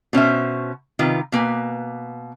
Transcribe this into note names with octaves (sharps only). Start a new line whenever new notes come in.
B2 C#4 C5 E5
C3 D#3 F4 B4
B2 A#3 B4 G#5